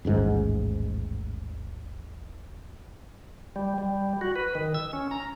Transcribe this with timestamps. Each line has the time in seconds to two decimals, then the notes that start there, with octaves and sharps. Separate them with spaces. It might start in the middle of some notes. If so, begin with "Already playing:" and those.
0.05 D#1 A1 G#2
3.56 G3
3.78 G3
4.21 F#4
4.36 B4
4.55 D#3
4.74 E6
4.93 C#4
5.11 A#5